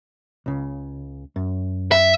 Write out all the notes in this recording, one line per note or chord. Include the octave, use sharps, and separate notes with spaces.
C#2 C#3
F#2
E5